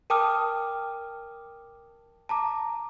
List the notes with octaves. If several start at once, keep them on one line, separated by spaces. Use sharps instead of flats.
A#4 G5 A5 D6 D#6 F6
A5 A#5 D6